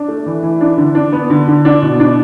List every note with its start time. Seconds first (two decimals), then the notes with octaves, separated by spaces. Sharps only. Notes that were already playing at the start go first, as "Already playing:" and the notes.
Already playing: D4
0.08 A3
0.26 E3
0.43 E3
0.61 D4
0.77 D3
0.95 D4
1.13 B3
1.30 D3
1.48 D3
1.65 D4
1.82 B2
2.00 D4